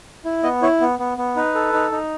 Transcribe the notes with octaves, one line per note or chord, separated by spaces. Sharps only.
E4
B3 D#5
E4 C#5
B3
B3
B3
D#4 B4
A4
D#4
D#4